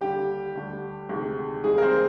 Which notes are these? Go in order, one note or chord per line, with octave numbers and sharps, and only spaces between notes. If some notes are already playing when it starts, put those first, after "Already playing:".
D#2 D3 G3 G4
D2 D3 G3
D2 C3 D#3 G#3
F1 D#2 D#3 G3 G#3 G#4
A#4
C4 C5